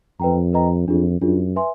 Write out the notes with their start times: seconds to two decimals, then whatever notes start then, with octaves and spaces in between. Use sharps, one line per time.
0.20 F2 B4 D#5 G5 A#5
0.53 B4 D#5 G5 A#5
0.88 F2 D4 F4 G#4
1.21 F#2 D4 F4 G#4
1.56 B4 E5 G#5 C6